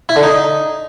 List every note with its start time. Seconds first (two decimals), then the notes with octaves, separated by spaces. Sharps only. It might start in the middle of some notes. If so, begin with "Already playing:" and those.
0.09 E4
0.16 D3
0.23 D#4